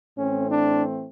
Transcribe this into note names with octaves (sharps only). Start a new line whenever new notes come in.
A2 E3 A3 C4 C#4
D4